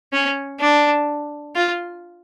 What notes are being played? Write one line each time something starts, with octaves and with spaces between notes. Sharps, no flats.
C#4
D4
F4